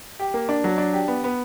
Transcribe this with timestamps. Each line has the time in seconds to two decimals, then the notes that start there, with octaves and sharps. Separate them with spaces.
0.19 G4
0.34 A#3
0.49 D4
0.64 F#3
0.78 D4
0.93 G4
1.08 B3
1.24 B3